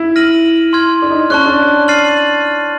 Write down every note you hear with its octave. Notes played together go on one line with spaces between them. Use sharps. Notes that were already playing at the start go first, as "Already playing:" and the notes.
Already playing: E4
F6 A#6 D#7 F#7
C6 F6 G#6
D4
D#4
D4
C#4 A5 C#6 F#6
D4
F6 A6 C7 D#7 F#7